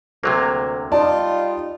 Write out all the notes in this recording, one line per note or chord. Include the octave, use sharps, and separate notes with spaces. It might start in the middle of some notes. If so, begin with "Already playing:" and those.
D2 C3 F#3 A#3
G3 D#4 F4 D5 A5